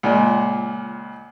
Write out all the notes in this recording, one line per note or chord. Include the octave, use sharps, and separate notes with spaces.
C#2 A#2